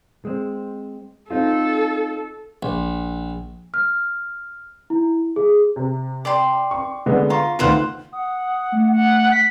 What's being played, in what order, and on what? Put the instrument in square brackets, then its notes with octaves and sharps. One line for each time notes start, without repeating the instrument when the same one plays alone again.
[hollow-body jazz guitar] G#3 C4
[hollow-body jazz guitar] C4 D#4 F4 [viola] A4
[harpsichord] A#1
[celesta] F6
E4
G#4
[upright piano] C3
[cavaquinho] D5 G5 C6
[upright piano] C#6
D3 G#3 B3
[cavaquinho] F4 [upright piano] A#5 C#6
[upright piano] D2 D#3 B3 [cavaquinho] F4 C5 F#5
[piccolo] F#5 [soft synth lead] D#6
[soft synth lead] A3
[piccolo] F#5
B6